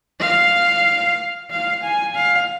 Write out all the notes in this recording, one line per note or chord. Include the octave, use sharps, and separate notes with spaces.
F5
F5
G#5
F5